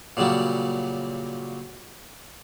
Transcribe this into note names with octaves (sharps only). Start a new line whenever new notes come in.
A#2 C#3 F#3 G3